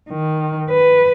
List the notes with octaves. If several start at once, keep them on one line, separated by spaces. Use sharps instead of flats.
D#3
B4